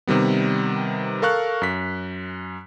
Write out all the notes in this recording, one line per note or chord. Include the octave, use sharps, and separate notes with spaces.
C3 D#3 G3 B3
A4 A#4 F5 C#6 F#6
F#2 B6